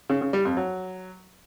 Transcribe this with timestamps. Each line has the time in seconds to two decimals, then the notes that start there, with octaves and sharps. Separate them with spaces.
0.10 C#3
0.21 C#3
0.33 G3
0.45 F2
0.57 F#3